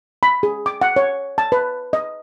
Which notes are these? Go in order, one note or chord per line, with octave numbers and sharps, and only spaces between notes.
B5
G#4
D6
F#5
C#5
A5
B4
D#5